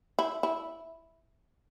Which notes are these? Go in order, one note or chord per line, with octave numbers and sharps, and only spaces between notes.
E4
E4